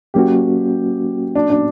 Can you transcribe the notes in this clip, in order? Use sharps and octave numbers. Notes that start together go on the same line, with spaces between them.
F#3 A#3 C#4 F#4 G4
D4
D4